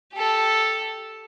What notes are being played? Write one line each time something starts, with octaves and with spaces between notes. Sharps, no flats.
G4 A4